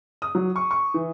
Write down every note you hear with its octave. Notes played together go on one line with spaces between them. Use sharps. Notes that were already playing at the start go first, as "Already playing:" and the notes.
D#6
F#3
C#6
C#6
E3